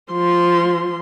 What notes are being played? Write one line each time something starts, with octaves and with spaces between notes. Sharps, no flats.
F3 C6